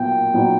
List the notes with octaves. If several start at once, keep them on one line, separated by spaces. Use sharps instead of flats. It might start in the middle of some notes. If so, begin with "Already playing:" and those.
Already playing: B1 A#2 B3 G5
A#2 F#3 B3 D#4